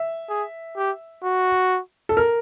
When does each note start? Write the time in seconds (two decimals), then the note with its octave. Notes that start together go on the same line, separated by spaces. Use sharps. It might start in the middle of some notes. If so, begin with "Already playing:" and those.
Already playing: E5
0.29 G#4
0.77 G4
1.24 F#4
2.09 A4
2.17 A#4